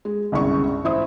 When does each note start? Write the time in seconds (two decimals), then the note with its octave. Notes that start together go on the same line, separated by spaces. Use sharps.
0.05 G#3
0.32 G1 C2 C#3 G#3 C#6
0.84 A1 E4 C5 E5 D#6